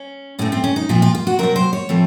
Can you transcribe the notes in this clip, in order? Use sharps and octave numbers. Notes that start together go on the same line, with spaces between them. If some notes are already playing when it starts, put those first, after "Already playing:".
Already playing: C#4
A2 A3 C4 C#4
C4
C#4
D#4
A#2 F3 C4 F4
F4
F4
F#4
C3 F#3 C4 A#4
C5
C#5
A2 F3 A3 C4